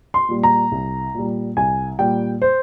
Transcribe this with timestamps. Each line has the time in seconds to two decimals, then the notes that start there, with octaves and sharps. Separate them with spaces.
0.14 C6
0.29 A#2 G3
0.43 A#5
0.72 C2
1.14 A#2 G3
1.57 C2 G#5
1.99 A#2 G3 G5
2.42 C5